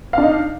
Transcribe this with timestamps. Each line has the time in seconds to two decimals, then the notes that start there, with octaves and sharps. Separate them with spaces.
0.13 F5
0.18 D4
0.22 D#4